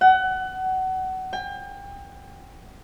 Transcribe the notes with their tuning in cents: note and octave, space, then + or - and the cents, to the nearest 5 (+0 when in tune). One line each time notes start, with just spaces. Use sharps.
F#5 +25
G5 +35